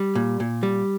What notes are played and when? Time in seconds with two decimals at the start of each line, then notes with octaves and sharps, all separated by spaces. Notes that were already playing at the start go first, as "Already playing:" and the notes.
Already playing: G3
0.15 A#2
0.40 A#2
0.63 G3